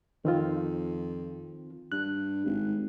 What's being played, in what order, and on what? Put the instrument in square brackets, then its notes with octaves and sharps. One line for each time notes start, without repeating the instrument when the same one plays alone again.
[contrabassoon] F2 [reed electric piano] D#3 C4 F4
[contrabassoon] G2 [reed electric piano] F#6
[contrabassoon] G#1